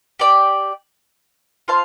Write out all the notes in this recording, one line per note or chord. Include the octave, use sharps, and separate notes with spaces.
G4 D5 G5
F4 C5 F5 A5